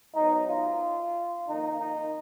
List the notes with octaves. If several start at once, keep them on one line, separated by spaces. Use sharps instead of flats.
G#2 F#3 B3 D#4
F4
F2 D#3 A#3 D#4
D#4